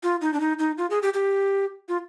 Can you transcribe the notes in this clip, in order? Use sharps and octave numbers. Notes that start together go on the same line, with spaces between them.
F4
D#4
D4
D#4
D#4
F4
G#4
G4
G4
F4